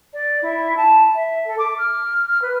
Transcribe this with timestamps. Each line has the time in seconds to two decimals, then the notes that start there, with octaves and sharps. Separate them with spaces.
0.13 D5
0.42 E4
0.76 A5
1.14 E5
1.45 A4
1.58 D6
1.78 F6
2.28 F6
2.41 B4